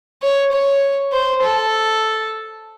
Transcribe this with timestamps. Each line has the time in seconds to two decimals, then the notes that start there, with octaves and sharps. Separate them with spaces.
0.22 C#5
0.52 C#5
1.13 C5
1.43 A4